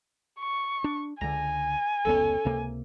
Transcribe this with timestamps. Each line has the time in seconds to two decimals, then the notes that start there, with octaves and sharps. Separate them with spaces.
0.40 C#6
0.84 D4
1.21 C#2 D3 G#5 A#5
2.05 F1 C#2 B3 C#4 A4
2.45 C#2 C3 A#3